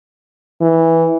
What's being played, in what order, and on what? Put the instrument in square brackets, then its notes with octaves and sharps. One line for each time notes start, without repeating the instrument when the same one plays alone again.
[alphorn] E3